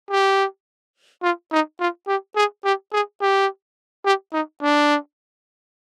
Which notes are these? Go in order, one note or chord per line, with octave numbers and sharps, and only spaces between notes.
G4
F4
D#4
F4
G4
G#4
G4
G#4
G4
G4
D#4
D4